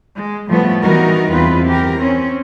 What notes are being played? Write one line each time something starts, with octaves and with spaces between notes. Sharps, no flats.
G#3
A2 F3 G3 A3 B3
E3 G3 B3 D#4 F#4 A#4
E2 C4 F4 B4
E3 G4 A#4
C4 C#4